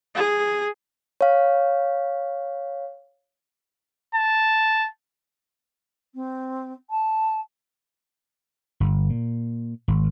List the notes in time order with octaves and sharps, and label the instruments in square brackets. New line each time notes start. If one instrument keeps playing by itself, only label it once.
[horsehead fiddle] G#4
[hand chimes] C#5 F5
[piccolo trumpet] A5
[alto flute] C4
A5
[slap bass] G1
A#2
G#1